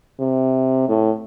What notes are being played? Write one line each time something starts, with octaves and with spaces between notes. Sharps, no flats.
C3
A2